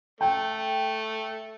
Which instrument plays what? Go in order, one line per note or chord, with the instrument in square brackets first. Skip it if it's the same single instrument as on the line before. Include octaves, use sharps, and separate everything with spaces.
[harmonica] A3 [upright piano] G5